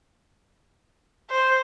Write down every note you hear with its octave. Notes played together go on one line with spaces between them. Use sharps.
C5